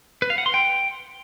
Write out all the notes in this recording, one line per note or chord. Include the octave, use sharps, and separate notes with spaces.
B4
F5
F#5
C6
G5